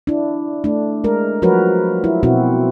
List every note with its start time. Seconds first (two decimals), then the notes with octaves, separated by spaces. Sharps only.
0.07 D4 E4
0.64 A3 D4
1.04 G#3 A#4
1.42 F3 F#3 F#4 A#4 B4 C#5
2.04 E4
2.23 B2 C4 E4 F#4